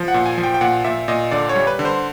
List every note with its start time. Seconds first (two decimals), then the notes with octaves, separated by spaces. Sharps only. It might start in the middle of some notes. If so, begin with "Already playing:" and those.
Already playing: F3
0.08 F#5
0.14 A#2
0.26 G#5
0.38 F3
0.44 G5
0.54 G5
0.61 A#2 F#5
0.84 A#2 E5
1.08 A#2 D#5
1.31 D3 D5
1.49 C#5
1.56 G3
1.67 B4
1.79 D3
1.85 C5